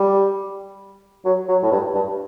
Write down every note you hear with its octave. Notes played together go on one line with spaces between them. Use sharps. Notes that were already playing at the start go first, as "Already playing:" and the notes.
Already playing: G3
F#3
F#3
A2
G2
G2